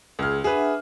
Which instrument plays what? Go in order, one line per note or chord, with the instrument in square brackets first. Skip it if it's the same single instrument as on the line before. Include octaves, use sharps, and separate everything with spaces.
[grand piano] C#2 F6 [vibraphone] G#4
[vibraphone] D4 E5 F#5 [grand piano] G#4 B4